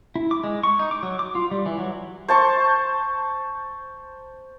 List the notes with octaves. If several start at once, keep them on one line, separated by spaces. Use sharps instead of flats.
E4
D6
G#3
C#6
D#4
D6
F#3
D6
F4
G3
E3
F#3
C5 A5 C#6